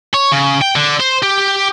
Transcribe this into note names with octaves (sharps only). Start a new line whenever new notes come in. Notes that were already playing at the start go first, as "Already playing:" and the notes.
C#5
C#3
G5
D3
C5
G4